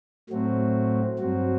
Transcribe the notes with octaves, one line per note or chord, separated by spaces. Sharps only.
A2 F#3 A3 C4 F#4
G2 F#3 C4 F#4